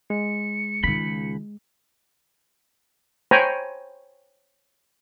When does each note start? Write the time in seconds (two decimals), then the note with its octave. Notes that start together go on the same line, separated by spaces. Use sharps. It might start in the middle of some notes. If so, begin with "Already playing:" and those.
0.10 G#3 C#7
0.84 C#2 D#3 F4 B5
3.31 C5 C#5 G5 G#5 A#5 B5